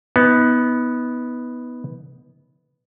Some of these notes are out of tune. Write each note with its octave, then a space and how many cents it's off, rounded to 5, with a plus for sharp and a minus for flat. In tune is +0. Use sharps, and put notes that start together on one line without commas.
B3 +0 D#4 +35